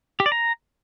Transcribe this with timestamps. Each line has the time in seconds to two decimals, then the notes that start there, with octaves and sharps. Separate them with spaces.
0.20 G4
0.26 D5
0.32 A#5